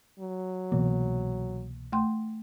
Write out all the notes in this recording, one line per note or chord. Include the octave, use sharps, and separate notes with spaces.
F#3
C2 B2 E3 A#3
A3 G5 C6